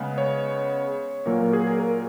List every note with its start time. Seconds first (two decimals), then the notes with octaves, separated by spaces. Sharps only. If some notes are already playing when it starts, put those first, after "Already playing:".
Already playing: C#3 G#3 B3
0.18 C#5
1.26 A#2 F#3 A#3 A#4
1.39 A#4
1.53 G#4
1.67 A#4
1.80 A#4